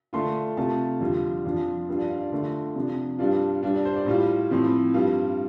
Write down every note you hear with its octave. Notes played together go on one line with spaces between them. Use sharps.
D3 A3 D4 F4 C6
C3 A3 F4 A5
F2 D3 G3 F4
F2 F3 D4 F4
G2 G3 D4 F4
D5
F5
D5
D3 A3 F4
C3 F3 D4
G2 G3 D4 F4 D5
G2 G3 D4 D5
D5
C5
D5
A2 G3 F4
A2 F3 C4
G2 G3 F4